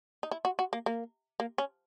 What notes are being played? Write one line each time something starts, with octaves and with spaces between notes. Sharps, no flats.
D#4
E4
F#4
F#4
A#3
A#3
A#3
C#4